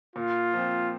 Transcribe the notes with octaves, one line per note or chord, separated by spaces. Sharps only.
A#2 F4
F3 C4